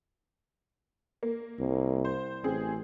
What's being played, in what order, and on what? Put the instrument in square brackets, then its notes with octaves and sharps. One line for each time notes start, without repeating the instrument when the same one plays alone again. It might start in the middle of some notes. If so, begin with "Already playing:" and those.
[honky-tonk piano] A#3
[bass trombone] C2
[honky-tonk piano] C5
[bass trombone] A1 [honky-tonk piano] C4 G#4